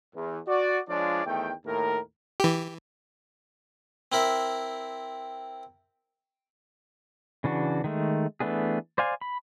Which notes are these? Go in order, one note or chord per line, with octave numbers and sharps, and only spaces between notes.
E2
F#4 D5
F3 G#3 D4 F4 C#5 D5
E2 D#3 A3 G5
D#2 A2 A#4
E3 G4
C4 E4 A#4 E5
C#3 E3 D4 F#4
D#3 G#3 A3
E3 A3 B3 D4 G#4
C5 D5 F5 G#5
B5